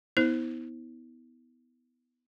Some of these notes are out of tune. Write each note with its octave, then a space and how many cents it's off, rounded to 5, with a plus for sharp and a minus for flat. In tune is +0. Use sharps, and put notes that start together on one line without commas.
B3 +5 E4 -40 C5 +0